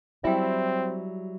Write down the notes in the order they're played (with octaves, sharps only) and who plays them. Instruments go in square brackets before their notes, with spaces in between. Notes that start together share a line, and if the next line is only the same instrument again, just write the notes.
[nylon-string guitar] F#3 G3 E4 [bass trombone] C4 [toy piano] E5 G5